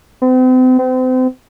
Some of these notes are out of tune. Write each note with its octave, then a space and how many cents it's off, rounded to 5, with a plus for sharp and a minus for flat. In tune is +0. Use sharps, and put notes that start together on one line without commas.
C4 -40
C4 -35